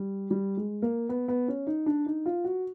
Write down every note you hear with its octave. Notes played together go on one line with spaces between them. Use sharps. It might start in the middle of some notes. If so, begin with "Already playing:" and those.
Already playing: G3
G3
G#3
A#3
B3
B3
C#4
D#4
D4
D#4
F4
F#4